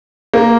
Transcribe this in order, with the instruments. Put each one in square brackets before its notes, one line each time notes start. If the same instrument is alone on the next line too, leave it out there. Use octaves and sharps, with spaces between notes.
[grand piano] A#3